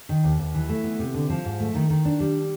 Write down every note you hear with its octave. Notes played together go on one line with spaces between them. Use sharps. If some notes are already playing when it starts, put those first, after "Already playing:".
D#3
D#2
D#2
E3
A3
B3
C3
D3
F3
G#2
A3
D#3
D#3
D4
G3